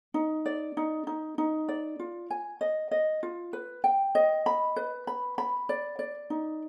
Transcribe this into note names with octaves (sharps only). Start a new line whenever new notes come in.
D#4
D5
D#4
D#4
D#4
D5
F4
G#5
D#5
D#5
F4
B4
G5
D#5
B5
B4
B5
B5
D5
D5
D#4